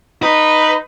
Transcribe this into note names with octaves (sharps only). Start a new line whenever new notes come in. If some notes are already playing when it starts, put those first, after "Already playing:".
D#4 B4